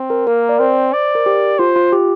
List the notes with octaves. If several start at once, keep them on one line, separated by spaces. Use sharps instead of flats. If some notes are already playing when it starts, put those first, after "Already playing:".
Already playing: C4
A#4
A#3 A#4
D5
C4 C5
D5
A#4
G4
F4 C5
F4
G4